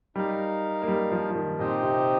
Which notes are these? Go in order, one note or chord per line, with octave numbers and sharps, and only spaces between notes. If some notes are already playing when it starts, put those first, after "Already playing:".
G3 D#4 A#4 F5
A#3
G3
F3
F3
D#3
A#2 C4 D#4 G4 C5 D#5
C3